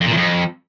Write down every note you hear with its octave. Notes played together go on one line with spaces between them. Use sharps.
F2
A#2
E2
F2